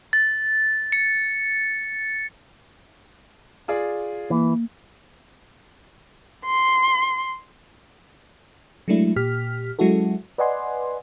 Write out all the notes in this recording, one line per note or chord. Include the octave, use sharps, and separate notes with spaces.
A6
C#7
F4 G#4 D5
E3 A#3
C6
F#3 G#3 A3 D4 E4
A#2 G4 F6 B6
F#3 G#3 C#4 E4 F#4 A4
B4 D5 D#5 F#5 G#5 C6